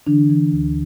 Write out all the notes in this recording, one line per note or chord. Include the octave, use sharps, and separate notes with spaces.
D3 E3 D4
E3
D2